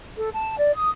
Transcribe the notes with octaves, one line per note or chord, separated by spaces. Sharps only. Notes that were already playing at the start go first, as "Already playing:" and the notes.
A4
A5
D5
D#6